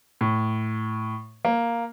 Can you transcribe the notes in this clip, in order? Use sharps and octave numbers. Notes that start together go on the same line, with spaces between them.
A2
A#3